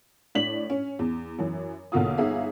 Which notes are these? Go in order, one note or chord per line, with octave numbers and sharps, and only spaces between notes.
A2 D4 B6 F#7
C#4
E2
F#2 E3
B1 E2 D3 A#3 F4 D#6
G1 D#4 G#4 E5 F5